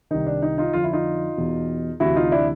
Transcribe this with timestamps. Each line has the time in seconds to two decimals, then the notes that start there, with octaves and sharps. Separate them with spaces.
0.11 C2 C3 D#3 D#4
0.27 D4
0.42 D#4
0.58 D#4 F4
0.73 F2 D3 F4
0.84 E4
0.93 D#4 F4
1.37 E2 B2
2.00 D2 C3 E3 E4 F#4
2.16 D#4 F4
2.32 D4 E4